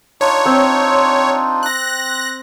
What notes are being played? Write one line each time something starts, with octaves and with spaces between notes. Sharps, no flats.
D4 D#4 F4 C#5
C4
F#6 A#6